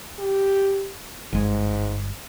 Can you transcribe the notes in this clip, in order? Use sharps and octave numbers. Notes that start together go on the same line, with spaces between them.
G4
G1 G#2 G#3